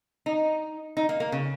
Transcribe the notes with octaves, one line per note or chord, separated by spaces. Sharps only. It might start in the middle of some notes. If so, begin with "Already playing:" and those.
D#4
D#4
A#3
A#3
C#3